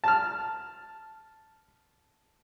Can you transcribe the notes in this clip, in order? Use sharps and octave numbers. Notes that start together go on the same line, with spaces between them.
A5 F6